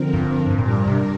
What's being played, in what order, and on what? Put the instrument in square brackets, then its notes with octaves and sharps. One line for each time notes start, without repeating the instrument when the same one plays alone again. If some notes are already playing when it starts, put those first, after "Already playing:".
Already playing: [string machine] D3 F3 C4 A#4
[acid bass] G2
G2
[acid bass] A#2 [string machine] G3 D4 A#4
[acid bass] G2
C3